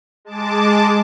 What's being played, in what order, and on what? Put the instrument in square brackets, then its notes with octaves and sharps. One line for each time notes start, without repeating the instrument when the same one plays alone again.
[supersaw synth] G#3 A5 D6